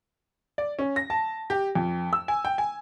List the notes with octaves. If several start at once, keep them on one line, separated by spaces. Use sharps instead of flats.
D5
C#4
A#6
A5
G4
F2
E6
G#5
G5
G#5